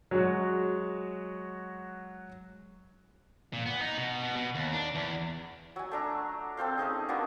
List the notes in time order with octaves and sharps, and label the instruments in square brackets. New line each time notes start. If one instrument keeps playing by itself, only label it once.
[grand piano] F#3 G#3 F#4
[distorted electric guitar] A#2
B3
D#4
B2
B2
B2
D#2
D4
E2
[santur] F#3 G#5
A3 D4 A#5
C4 A4 C5 F5
A3 C#4 D#4 G#4
A#3 B3 D4 F#4